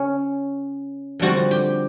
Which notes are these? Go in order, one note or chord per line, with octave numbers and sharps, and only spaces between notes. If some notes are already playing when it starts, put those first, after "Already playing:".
Already playing: C#3 C#4
F2 D3 G3 C4 F#4
G4